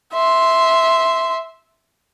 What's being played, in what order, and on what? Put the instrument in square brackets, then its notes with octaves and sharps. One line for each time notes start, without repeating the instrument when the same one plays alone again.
[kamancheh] E5 C6